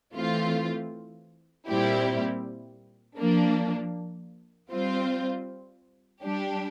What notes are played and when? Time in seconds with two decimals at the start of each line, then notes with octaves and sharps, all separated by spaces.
0.14 E3 A3 C4 F4
1.67 A#2 G3 C4 E4 G4
3.18 F3 A#3 D4
4.71 G3 C4 F4 C5
6.23 G3 D4 G4